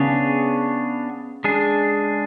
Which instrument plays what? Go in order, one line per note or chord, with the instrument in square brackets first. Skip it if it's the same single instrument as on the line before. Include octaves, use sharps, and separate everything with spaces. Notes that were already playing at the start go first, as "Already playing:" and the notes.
Already playing: [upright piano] C#3 [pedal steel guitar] B3 D4 G#4 C#5
[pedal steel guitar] G#3 D4 G#4